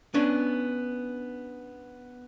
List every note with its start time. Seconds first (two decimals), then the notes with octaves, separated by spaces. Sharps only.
0.14 B3 C#4 D4